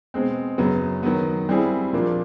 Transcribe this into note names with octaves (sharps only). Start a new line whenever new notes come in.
B2 G#3 C4
F#2 C#3 F#3 B3
D#3 F#3 B3
G3 C4 E4 G#4
A#2 F3 A#3 D4